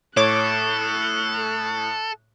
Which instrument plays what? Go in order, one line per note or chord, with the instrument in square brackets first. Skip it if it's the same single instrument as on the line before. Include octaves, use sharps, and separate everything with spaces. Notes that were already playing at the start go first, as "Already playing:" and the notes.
[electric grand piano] A2 [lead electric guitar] A4 [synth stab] C#5 D6 [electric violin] F#6